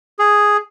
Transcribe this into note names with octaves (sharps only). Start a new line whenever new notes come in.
G#4